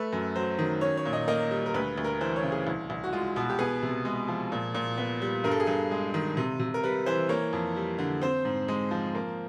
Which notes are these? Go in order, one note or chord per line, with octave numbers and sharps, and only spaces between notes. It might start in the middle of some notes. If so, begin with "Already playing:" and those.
Already playing: A3 B4
F#2
F#3 C5
D#3
C#4 C#5
C#5
A#2
D#5
A#3 D#5
G3
A#4
D2 B4
D2
A#4
E3 C5
C#5
C#3
G#4
C2
C2
F#4
G#3 F4
B2 F#4
G4
B3 G#4
C3
G#3
F3
A#2
A#2
B3
G3
G2 A#4
A4
G#4
G2 A4
G#3
D#3
C3
C3
A#4
G3 B4
E3 C5
A#3 C#5
F2
G3
D3
C4 C5
G#2
G#3
F3
A#3